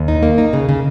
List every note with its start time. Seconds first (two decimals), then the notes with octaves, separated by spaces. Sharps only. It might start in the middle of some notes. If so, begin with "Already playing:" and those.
Already playing: D#2
0.08 D#4
0.23 A#3
0.38 D#4
0.53 C#3
0.69 C#3